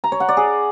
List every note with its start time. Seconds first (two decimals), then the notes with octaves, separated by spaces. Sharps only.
0.04 A#5
0.12 C#5
0.20 F#5
0.29 D5
0.37 G#4